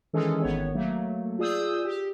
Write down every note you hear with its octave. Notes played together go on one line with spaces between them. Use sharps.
D#3 E3 G#3 C#4 G#4 A4
G#1 D#3 B3 C#5
F#3 A3 A#3
F4 G#4 D5 D#6 E6 G6
G4